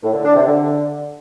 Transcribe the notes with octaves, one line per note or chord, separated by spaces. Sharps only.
A2
D3
D4
C3
D3